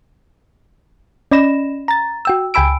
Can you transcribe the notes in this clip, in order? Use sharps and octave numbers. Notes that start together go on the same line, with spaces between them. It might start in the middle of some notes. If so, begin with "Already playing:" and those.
C#4 D5 D#5 B5 A#6 E7
A#5 A6
F#4 G5 E6
C#2 G5 G#5 B5 E6 D7